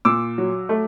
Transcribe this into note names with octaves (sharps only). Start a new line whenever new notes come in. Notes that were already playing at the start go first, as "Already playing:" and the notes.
A#2 D6 E6
F#3
A3